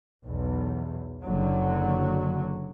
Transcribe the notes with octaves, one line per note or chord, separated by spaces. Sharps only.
B1 E2
F#1 F#2 D3 F#3